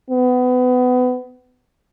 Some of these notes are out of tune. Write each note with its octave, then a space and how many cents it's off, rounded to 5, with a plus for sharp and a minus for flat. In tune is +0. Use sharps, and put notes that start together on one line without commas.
B3 +25